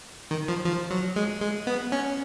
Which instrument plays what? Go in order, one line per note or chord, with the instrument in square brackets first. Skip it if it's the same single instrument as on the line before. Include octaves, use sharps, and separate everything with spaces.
[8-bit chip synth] D#3
F3
F3
F#3
G#3
G#3
B3
C#4